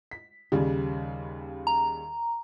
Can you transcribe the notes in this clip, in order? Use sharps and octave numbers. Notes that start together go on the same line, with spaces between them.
B6
D#2 C#3 G3
A#5